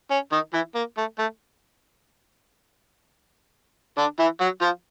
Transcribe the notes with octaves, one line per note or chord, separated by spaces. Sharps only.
C#4
D#3 D#4
E3 E4
A#3
A3
A3
D3 D4
E3 E4
F#3 F#4
F3 F4